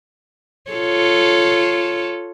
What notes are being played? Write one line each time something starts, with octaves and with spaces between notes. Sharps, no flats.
F4 A4 C#5